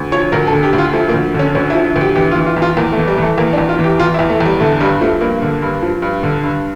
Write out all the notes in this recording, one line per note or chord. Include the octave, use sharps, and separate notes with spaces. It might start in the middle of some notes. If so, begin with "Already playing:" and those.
Already playing: D2
F3 C#5
D2 A#4
A4
D3
G4
D2
F4
F3 A3
A#3
D2
D3 C#4
D2 C#4
E4
F3
E4
D2
G4
E3 G4
F4
E3
F4
E2
F4
E2 A#3
A3
E3
G3
E3 A3
E2 A#3
D4
E2
F4
E3
G4
E3 F4
E4
E2
A3
E2 G3
D3 A3
G2 G3
F3 A3
G2 A#3
D3
G2
F3
G2
D3
G2